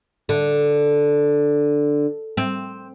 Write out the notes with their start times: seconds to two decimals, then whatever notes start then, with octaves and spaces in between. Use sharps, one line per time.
0.29 D3
2.37 C4